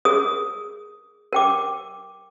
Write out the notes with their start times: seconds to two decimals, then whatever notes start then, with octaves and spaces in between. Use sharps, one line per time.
0.05 G#4 A#4 D#6
1.33 A#4 G5 D6